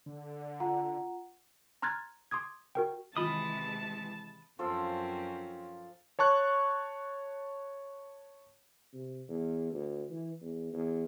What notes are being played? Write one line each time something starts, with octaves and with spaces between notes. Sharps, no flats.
D3
F4 F#5 A#5
A#5 C6 F6 F#6 G#6 A6
C6 D6 D#6 G#6
F#4 A#4 G5
C3 D#3 E3 G#3 F4 A5 B5 D#6
F#2 F3 C4 C#4 A4 F5
C#5 A5 C#6 F#6
C3
E2
D2
E3
E2
E2